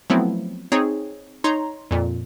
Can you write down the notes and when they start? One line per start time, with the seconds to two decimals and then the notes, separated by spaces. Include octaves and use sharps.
0.10 F3 F#3 A3 B3 C4 E4
0.72 C4 D#4 G#4 C#5
1.44 D#4 C#5 A#5 C6
1.91 F2 A#2